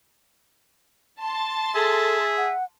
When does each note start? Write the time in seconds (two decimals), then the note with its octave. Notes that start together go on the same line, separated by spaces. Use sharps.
1.20 A5 C6 A6
1.75 G#4 A4 E5
2.37 F#5